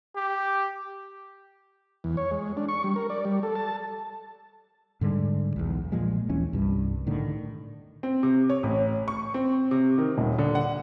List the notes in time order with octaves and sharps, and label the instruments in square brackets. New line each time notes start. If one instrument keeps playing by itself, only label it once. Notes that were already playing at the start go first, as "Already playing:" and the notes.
[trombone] G4
[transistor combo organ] E2
C#5
G#3
D4
C#6
G3
A#4
D5
G3
A4
A5
[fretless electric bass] G#2 D3 G3 G#3
B1 E2
A#2 F3 G#3
D#2 E3 C#4
C2 G2
A2 D3 D#3
[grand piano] C4
C3
C#5
A1
C#6
C4
C3
D#3
D#1
D3
F#5